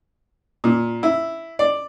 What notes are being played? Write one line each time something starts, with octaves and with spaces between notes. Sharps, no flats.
A#2
E4
D5